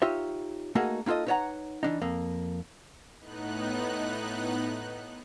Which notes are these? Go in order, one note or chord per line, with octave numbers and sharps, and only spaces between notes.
D#4 F4 G4 C#5 E5
A3 A#3 D#4 F#4 G#4 A#4
A#3 D#4 F4 A4 D#5
D#4 B4 C#5 D5 F#5 A#5
E3 D4 D#4
F2 A#3
A2 B3 D#4 F#6